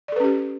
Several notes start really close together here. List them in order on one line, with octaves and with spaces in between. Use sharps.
D5 A4 B4 C#4 G4